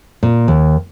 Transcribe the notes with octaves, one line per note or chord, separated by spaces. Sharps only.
A#2
D#2